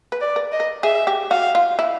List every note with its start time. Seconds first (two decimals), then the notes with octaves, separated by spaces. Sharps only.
0.12 B4
0.21 D5
0.36 A#4
0.52 D#5
0.60 A#4
0.83 G#4 E5
1.07 G4
1.31 F#4 F5
1.55 F4
1.79 E4